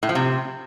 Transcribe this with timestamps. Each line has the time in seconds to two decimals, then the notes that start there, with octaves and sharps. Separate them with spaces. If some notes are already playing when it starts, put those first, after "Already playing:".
0.03 A2
0.09 F3
0.15 C3